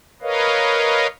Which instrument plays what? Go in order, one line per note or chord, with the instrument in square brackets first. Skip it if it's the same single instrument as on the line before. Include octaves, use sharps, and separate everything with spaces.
[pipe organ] A#4 B4 C#5 D#5 F5